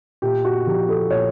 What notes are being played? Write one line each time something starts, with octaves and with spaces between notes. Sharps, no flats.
A#2 G4
F#4
F3 G4
A4
A#2 C#5